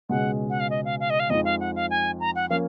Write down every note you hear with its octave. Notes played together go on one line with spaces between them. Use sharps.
C#2 B2 G#3 C#4 F#5
F#5
F5
D#5
F5
F5
D#5
F5
F2 F3 G#3 D#4 D#5
F5
F#5
F5
G#5
A#5
F#5
F3 A#3 C#4 F5